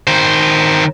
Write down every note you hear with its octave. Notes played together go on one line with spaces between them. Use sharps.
D#3 C5